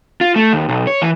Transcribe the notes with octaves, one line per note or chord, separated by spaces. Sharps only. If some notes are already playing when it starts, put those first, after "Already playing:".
F4
A3
D#2
B1
C#5
E3